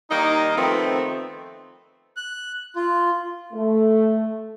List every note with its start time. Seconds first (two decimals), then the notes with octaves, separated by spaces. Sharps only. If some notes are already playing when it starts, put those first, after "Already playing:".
0.11 D#3 G3 A#3 D#4
0.56 D#3 F3 A3 B3 C4
2.17 F#6
2.76 F4
3.53 A3